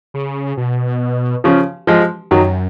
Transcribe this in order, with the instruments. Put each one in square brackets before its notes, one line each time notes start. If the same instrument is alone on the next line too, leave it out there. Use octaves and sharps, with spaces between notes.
[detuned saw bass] C#3
B2
[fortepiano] C#3 F3
F3 G#3
[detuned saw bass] F#2 [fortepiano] D#3 F#3